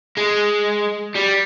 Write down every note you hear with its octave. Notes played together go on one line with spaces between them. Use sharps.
G#3
G3